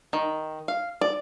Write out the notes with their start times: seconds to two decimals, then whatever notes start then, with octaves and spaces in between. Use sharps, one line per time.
0.13 D#3
0.68 F5
1.01 D5